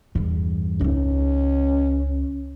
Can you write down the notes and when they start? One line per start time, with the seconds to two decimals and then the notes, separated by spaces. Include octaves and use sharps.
0.15 E2 G2
0.81 C#2 C#4 D#4